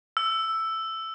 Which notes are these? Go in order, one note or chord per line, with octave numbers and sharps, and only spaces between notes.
E6